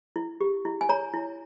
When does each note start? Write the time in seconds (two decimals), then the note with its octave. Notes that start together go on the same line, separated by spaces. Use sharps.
0.16 E4
0.41 G4
0.65 E4
0.81 G#5
0.89 C#5 A#5
1.14 E4